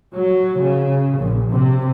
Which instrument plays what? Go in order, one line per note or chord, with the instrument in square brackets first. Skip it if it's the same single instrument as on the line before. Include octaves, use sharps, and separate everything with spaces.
[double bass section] F#3
C#3
A#1
C3